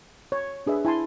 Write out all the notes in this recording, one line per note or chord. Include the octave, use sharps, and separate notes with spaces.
C#5
D4 G#4 B4 E5
E4 G#5 A5 C6